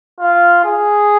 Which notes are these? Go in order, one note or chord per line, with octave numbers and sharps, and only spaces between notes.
F4
G#4